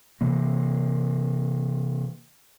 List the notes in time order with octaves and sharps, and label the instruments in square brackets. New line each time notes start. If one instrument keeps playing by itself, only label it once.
[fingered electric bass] C3 E3 A#3